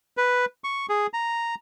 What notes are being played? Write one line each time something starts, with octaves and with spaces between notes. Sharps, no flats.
B4
C#6
G#4
A#5